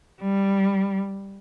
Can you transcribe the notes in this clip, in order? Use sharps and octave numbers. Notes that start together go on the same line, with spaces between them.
G3